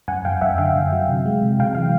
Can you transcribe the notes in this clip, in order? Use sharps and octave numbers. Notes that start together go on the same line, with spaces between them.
F#2 F#5 G#5
F#2 F5 G5
F#2 E5 F#5
D3 F5 G5
D3
F#3
C3
G#3
C3
C3 F5 G5
E3 F5